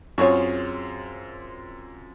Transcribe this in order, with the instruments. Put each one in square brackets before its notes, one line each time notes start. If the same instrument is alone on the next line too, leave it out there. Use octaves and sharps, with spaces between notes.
[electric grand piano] F#2 C4 F4 [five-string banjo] F#4 G#4 C#5